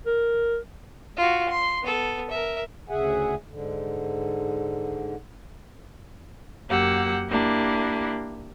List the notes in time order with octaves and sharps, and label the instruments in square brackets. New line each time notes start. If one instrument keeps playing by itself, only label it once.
[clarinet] A#4
[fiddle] F4 F#4
C6
B3 A4
A#4 E5
[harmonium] D2 C#3 G#4 E5 F#5 G#5
G#2 D3
[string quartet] F#2 A#3 G4 F#5 E6
A#3 D4 E4 G4